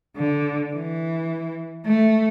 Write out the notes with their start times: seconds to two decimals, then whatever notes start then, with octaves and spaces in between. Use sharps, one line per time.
0.17 D3
0.74 E3
1.86 A3